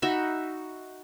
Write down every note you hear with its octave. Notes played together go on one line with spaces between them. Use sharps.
D#4 F#4 E5 B5